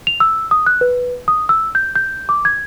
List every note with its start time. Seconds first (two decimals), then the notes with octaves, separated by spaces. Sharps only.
0.07 F7
0.20 E6
0.51 D#6
0.66 F#6
0.81 B4
1.28 D#6
1.49 E6
1.75 G6
1.96 G6
2.29 D6
2.45 G#6